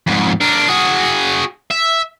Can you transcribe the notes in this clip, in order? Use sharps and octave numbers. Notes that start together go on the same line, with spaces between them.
F2 G#2
D4 A#4
F#4 G#4
E5